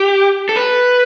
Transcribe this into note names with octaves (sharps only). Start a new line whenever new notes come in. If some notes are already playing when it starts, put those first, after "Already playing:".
Already playing: G4
A4
B4